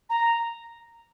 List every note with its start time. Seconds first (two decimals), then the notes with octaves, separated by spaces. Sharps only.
0.09 A#5